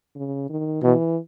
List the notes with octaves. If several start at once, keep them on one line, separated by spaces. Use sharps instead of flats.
C#3
D#3
B2 E3